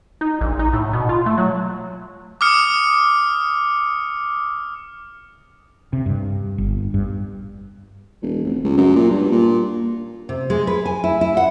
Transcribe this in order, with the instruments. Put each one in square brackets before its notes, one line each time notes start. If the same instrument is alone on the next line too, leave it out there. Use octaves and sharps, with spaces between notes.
[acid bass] D#4
A#1
D#4
A2
B2
F4
A3
F#3
[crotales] D6 D#6 F6 C#7
[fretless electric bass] C3
G2
G1
G2
[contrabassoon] E1
F1
C#2
F#2
A#2
G2
A#2
[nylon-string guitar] C3
G#3
B4
G#5
E4
E4
F#5